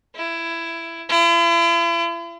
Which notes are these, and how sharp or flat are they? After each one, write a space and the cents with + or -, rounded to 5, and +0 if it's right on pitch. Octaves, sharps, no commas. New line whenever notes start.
E4 +15
E4 +45